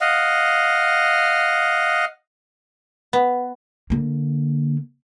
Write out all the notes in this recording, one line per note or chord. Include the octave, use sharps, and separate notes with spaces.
D#5 F5 F#5
B3
D3 A#3